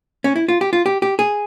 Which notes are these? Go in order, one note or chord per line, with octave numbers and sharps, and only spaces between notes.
C#4
E4
F4
G4
F4
G4
G4
G#4